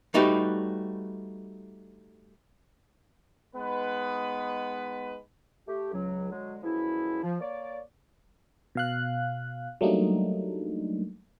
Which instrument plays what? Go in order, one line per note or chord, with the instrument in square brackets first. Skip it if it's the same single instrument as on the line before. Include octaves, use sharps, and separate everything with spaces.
[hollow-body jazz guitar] G3 A3 D#4 F#4 G4 B4
[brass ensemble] G#3 B3 D#4 B4
[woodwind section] A3 G4
C#2 F#3
D3 F#3 G#3
F#2 F3 G#3 B3 E4
F3
A#3 C#5 D5
[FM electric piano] B2 F5 F#6
F#3 G3 A3 A#3 D4 D#4